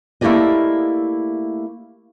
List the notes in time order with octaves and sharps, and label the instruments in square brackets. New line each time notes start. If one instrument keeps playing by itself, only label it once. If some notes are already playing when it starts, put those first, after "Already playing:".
[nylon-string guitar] A3 A#3 E4 G4 D5 D#5